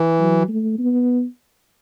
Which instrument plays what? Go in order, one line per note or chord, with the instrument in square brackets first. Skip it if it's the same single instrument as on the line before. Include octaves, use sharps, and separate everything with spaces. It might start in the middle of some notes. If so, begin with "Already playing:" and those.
Already playing: [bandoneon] E3
[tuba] F#3
A3
B3